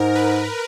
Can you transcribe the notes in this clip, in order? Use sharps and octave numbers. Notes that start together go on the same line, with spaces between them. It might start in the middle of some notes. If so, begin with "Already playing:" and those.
Already playing: G#2 A#4
B4